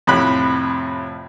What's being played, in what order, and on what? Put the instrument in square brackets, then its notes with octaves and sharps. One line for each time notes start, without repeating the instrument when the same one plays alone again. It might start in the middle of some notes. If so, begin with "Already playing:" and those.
[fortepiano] F2 A2 C3 B5 F#6